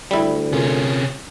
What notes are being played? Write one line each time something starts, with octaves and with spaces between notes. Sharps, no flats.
D2 G3 E4
C3 C#4 F4 G#4 A#4